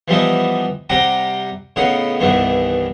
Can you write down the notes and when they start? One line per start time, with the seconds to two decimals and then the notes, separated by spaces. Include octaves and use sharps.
0.08 E3 F3 G3 B3 D#4 E4
0.90 C3 G3 G4 F#5 G5 A#5
1.76 A2 C#3 B3 D#4 F#5
2.20 C2 G2 D#3 E3 B3